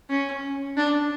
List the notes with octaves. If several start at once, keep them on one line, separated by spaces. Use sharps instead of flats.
C#4
D4